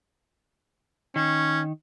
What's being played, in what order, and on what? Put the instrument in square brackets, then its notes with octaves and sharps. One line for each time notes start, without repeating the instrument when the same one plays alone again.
[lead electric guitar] D#3 [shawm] C#4